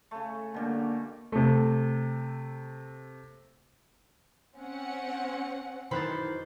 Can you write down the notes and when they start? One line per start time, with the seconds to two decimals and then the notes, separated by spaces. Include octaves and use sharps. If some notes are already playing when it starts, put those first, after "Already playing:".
0.11 C#3 A3
0.54 B2 D3 G3 A3 A#3
1.32 C3 A3
4.56 C4 C#4 F#5
5.91 F#2 D#3 E3 C5 B5 F#6 A6